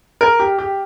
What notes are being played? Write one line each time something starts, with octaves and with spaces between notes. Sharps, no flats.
A#4
G4
G4